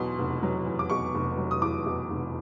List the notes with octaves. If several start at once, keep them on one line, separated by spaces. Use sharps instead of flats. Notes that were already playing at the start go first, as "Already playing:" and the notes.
Already playing: E2 B2 F#3 C6
F1
F#3
E2
D6
B2 C#6
F1
F#3
D#6
E2 D6
B2
F1